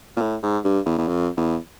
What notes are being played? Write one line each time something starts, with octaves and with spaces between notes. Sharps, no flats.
A#2
A2
G#2
G2
E2
E2
F2
E2